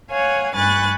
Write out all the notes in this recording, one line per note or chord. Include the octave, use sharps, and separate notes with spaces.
C#5 F5 F#5 G#5
G2 G#5 B5 C#6 F#6 A6